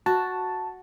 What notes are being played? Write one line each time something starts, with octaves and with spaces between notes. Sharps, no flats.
F#4 A5